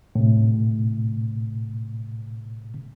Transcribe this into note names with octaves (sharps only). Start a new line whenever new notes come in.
A2 C3